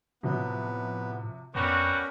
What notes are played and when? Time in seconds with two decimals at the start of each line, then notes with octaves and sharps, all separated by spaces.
0.23 A2 C3 F3 F#3 B3
1.55 F2 G3 B3 C#4 F#4 A#4